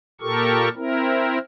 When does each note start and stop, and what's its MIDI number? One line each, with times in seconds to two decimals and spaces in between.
0.21 0.69 46
0.21 0.69 67
0.21 0.69 69
0.21 0.69 70
0.21 0.69 85
0.76 1.38 60
0.76 1.38 64
0.76 1.38 70